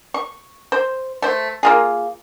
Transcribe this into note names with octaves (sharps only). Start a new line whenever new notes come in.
C#6
C5
A3 C5
A#3 F4 G#4